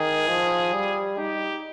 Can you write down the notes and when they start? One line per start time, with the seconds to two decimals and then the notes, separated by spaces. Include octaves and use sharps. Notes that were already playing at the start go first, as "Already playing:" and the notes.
Already playing: D#3 G#4
0.28 F3
0.74 G3
1.18 D#4 G4